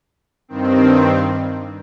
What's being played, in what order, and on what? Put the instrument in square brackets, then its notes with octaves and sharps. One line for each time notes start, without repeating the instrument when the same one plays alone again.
[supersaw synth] G2 D#3 C4